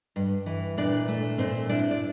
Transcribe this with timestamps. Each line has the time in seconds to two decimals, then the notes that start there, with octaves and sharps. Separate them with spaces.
0.16 G2
0.46 E3
0.77 A#2 D4 D5
1.08 A3
1.38 A#2 C4 C5
1.69 D4 E4 D5
1.91 D5